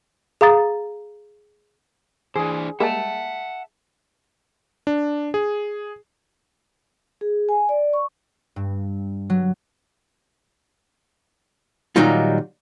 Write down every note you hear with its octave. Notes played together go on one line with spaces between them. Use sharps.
G#4 F5 A#5 D#6 A6
E3 D4 G#4 C5
G3 G#3 A#3 E5 F#5 A5
D4
G#4
G#4
G#5
D5
C#6
G2
F#3
A#2 D#3 F#3 G3 D#4 F4